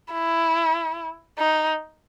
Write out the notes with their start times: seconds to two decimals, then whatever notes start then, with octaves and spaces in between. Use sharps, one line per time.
0.12 E4
1.38 D#4